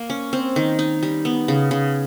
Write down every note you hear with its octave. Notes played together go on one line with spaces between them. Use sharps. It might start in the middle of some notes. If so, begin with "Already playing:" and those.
Already playing: A#3
C#4
C4
D#3
D#4
G3
B3
C#3
C#3